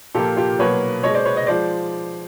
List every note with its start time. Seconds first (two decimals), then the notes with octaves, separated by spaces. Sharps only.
0.15 A#2 F3 A#3 G4 A4
0.37 F4 G4
0.59 B2 F#3 A#3 B4 C#5
1.03 B2 G#3 C#5 D#5
1.14 C5 D5
1.25 B4 C#5
1.36 C#5 D#5
1.47 F3 G#3 C5 D5